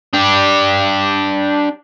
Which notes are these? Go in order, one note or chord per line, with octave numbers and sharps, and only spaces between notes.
D4 G4